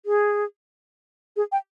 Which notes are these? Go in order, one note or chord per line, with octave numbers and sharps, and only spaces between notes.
G#4
G#4
G5